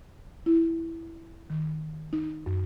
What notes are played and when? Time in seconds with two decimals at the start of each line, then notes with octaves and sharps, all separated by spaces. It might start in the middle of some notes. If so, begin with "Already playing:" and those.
0.46 E4
1.50 D#3
2.13 D#4
2.46 F#2